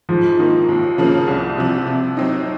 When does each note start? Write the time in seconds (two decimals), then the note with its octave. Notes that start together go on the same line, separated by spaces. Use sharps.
0.09 G#2 F3
0.39 D#3 A#3 D#4
0.69 D#2
0.98 C#3 F3 A#3
1.28 C2
1.57 C3 F3
1.86 C3
2.17 F#3 C4 D#4